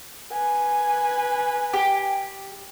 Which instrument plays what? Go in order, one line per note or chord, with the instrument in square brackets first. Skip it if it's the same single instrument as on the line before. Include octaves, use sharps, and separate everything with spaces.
[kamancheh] B4 G#5
[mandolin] G4